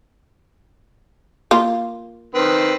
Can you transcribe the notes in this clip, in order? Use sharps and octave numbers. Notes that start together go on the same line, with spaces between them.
A#3 F4
D#3 C4 B4